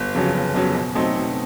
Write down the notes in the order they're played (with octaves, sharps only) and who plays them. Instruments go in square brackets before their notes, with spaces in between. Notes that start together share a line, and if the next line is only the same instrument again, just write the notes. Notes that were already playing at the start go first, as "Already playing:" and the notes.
Already playing: [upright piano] G1
F2 C#3 F#3
G1
F2 C#3 F#3
B2
F#3 A3 C4 D#4
B2